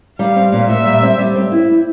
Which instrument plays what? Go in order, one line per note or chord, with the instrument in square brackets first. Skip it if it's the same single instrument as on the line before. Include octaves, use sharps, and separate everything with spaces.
[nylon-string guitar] G3 [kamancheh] F5
[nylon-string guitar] C4
A#2
[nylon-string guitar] A#2 [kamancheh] E5
[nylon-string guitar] G3
C4
G3
C4
E4